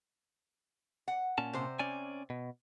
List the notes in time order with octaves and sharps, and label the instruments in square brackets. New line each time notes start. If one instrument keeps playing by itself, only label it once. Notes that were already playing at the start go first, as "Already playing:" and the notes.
[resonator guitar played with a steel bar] F#5
[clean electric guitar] A#2 C#4 A5
[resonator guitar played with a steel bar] C3 C5
[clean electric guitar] C#4 D5 G#5
B2